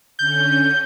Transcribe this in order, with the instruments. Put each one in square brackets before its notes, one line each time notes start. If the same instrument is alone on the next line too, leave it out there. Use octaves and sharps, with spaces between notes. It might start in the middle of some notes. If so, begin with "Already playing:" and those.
[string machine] D3 C#4 [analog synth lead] G6